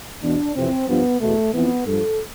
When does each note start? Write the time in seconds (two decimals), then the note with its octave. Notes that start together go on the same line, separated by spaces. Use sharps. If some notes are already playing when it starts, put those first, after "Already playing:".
0.23 E2 B2 D4
0.56 F2 C3 E3 C4
0.89 G2 F3 B3
1.21 E2 B2 A3
1.54 F2 E3 B3
1.86 G2 F3 A4